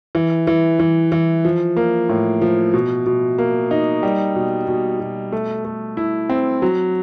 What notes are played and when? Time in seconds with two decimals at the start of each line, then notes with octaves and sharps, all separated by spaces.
0.15 E3
0.47 E3
0.79 E3
1.12 E3
1.45 F3
1.77 A#3
2.09 A2
2.42 F3
2.74 B2
3.06 B2
3.38 A#3
3.71 D#4
4.03 G3
4.35 B2
4.68 B2
5.00 B2
5.32 A3
5.65 A3
5.97 E4
6.29 C4
6.62 F#3